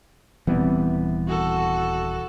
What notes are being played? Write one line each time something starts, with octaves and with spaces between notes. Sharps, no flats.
D#1 C3 E3 G3 B3
F#4 A4